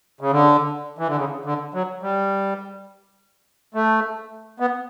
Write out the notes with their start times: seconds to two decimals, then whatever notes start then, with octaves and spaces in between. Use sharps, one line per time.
0.21 C#3
0.31 D3
0.98 E3
1.07 D3
1.17 C#3
1.45 D3
1.74 F#3
2.02 G3
3.74 A3
4.60 B3